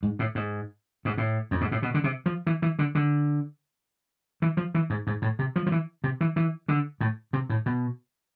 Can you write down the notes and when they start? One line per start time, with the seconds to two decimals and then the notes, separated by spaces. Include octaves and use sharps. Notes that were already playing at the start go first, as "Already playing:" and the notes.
0.03 G#2
0.19 A2
0.35 G#2
1.05 G#2
1.17 A2
1.51 F2
1.61 G#2
1.72 A2
1.82 B2
1.94 D3
2.04 C3
2.26 F3
2.47 E3
2.62 E3
2.79 D3
2.95 D3
4.42 E3
4.57 F3
4.75 E3
4.90 G#2
5.07 G#2
5.22 A2
5.39 C3
5.56 F3
5.66 F3
5.72 E3
6.04 C3
6.21 E3
6.36 E3
6.68 D3
7.01 A2
7.33 C3
7.50 A2
7.66 B2